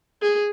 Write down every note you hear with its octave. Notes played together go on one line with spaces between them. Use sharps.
G#4